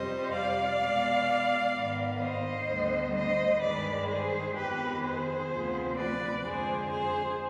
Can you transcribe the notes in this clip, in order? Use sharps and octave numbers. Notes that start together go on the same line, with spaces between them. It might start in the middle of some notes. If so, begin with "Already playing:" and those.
Already playing: F2 C3 G3 C5 D#5
D5 F5
B2 G#3 B3
G#2 D#3 B3
C5 D#5
D2 D3 G3 B3
C5 D#5
G2 D#3 G#3 B4 D5
G#4 C5
F2 D#3 B3 G4 B4
G#4 C5
D2 C3 F3 B3
B4 D5
F2 D3 G#3 G#4 C5
G#4 C5